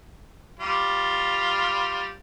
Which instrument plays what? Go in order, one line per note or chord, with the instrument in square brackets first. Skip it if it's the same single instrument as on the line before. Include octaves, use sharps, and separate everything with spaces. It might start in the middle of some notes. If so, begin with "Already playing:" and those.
[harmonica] G3 F4